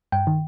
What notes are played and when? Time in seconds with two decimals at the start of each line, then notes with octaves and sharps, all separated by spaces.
0.12 G2 G5
0.27 D#3